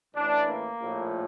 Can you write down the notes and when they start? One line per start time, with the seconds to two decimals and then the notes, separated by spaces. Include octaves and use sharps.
0.15 A1 A2 E3 D4
0.47 A#3
0.80 A#1 A2 F3